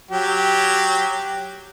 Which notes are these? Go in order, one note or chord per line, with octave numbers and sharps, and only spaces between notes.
F#3 G4